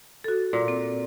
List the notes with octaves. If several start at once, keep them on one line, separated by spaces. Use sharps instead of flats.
F#4 A4
A#2
C4